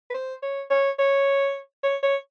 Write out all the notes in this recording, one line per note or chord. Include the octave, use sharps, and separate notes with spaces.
B4
C5
C#5
C#5
C#5
C#5
C#5